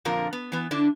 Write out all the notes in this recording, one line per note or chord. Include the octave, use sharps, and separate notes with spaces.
F2 A#2 D3 F4 A#4
B3
E3 B3
D3 D4 E4